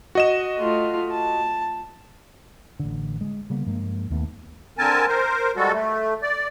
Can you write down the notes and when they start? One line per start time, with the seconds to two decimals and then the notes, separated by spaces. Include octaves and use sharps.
0.15 F#4 D#5 E7
0.58 A3 F4
1.11 A5
2.80 A1 D3
3.21 G#3
3.50 C#3 G3 A#3 B3
3.66 G2 F3 G#3 A#3
4.10 D#2 D#3 A3 B3
4.78 D3 C4 A#4 G#5 A5
5.08 A#4 C5
5.56 G3 G#3 F#4 A4
5.72 A3
6.22 D5